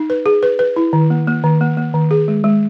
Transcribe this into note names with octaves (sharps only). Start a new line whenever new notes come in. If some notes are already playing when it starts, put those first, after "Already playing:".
Already playing: D#4
B4
G#4
B4
B4
E4
D#3
A#3
A#3
D#3
A#3
A#3
D#3
G#4
G#3
G#3